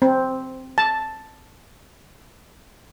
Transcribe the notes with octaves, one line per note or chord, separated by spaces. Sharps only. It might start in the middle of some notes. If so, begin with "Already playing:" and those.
C4
A5